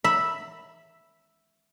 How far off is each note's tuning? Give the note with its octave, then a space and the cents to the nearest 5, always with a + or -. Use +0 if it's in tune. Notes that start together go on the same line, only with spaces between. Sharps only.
E5 +0 B5 -5